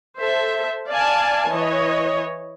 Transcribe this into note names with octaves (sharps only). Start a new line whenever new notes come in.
A4 C5 E5
D5 F5 G#5 A5
E3 C#5 D#5